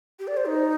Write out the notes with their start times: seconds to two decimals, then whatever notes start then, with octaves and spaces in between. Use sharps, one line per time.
0.19 G4
0.27 D5
0.37 C5
0.45 D#4